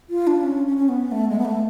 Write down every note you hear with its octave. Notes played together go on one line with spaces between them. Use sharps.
F4
D4
C#4
C#4
C#4
B3
A3
G#3
B3
A3